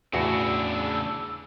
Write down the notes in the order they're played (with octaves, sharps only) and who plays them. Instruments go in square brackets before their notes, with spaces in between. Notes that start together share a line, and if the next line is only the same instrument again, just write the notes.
[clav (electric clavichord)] E2 A2 [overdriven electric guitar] C#3 D4 [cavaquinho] F#4 [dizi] E6